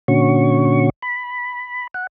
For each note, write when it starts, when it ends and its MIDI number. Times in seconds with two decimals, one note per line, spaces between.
0.08 0.90 46
0.08 0.90 50
0.08 0.90 61
0.08 0.90 66
0.08 0.90 85
1.02 1.87 83
1.94 2.07 78